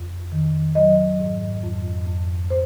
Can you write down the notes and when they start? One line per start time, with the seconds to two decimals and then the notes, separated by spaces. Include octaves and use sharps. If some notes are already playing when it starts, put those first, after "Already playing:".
Already playing: F2
0.32 D#3
0.75 F#3 D#5
1.19 G#2
1.63 F2
2.07 F2
2.50 C5